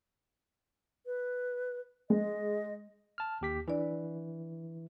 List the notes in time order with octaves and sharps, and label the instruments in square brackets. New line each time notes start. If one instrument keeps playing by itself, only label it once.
[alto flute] B4
[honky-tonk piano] G#3 [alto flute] D#5
[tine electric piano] A5 F6
D#2 G4 B6
[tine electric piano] E3 [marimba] D4 D5